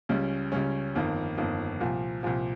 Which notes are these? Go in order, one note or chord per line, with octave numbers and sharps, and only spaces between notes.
C#2 C#3 G3 C#4
C#2 C#3 G3 C#4
G1 F2 D#3 A#3
G1 F2 D#3 A#3
C2 A#2 F3
C2 A#2 F3